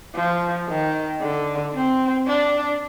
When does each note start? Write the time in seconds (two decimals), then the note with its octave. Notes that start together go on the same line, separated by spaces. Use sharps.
0.16 F3
0.69 D#3
1.21 D3
1.75 C4
2.27 D4